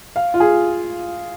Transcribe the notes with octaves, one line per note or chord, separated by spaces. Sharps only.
F5
F4
G#4